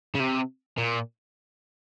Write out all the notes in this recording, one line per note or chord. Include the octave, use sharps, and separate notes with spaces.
C#3
C3
A#2